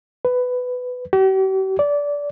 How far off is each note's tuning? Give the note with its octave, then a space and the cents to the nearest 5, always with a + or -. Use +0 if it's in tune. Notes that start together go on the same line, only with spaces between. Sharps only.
B4 +15
G4 -45
D5 -20